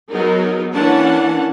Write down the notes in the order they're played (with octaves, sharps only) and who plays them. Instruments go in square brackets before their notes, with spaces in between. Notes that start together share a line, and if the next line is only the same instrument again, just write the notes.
[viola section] F#3 B3 D#4 G#4 A#4
E3 A#3 C#4 D4 F#5 A5